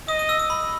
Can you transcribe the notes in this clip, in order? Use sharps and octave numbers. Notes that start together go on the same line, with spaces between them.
D#5 D#6
D#6
E6
D#6
B5